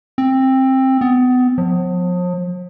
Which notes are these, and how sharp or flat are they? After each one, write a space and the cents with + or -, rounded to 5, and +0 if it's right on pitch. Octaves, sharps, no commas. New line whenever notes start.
C4 +15
B3 +30
F3 +40